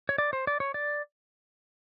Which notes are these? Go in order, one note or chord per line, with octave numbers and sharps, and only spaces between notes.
C#5
D5
C5
D5
C#5
D5